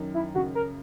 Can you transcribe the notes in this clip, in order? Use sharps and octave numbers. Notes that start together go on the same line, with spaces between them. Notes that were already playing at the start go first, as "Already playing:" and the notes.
Already playing: F#2 D#3
E4
C#3 F#4
A#4